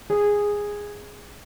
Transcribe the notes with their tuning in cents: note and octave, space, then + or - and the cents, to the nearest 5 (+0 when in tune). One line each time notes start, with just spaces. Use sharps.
G#4 -10